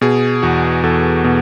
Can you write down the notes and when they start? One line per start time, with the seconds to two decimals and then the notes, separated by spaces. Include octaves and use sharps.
0.01 B2 G#4
0.43 E2 F#4
0.83 E2 A4
1.24 B2